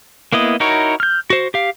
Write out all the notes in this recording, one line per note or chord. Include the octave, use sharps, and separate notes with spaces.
A#3 B3 E4 D#5
D#4 E4 F#4 A#4 C#5
F6 G6
F#4 C5
G4 F5